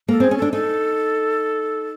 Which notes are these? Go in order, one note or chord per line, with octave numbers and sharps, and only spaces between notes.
A#3 A4
C4 G#4
C#4
D4 A4
D#4 A4